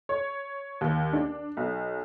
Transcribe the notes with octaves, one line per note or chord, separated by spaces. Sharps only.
C#5
D#2
D4
B1